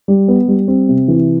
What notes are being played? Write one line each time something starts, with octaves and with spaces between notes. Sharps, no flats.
G3
B3
G3
C4
C3
E3